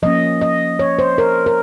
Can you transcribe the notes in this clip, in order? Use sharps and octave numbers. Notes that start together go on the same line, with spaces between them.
F3 A#3 C#4 D#5
D#5
C#5
C5
A#4
A#4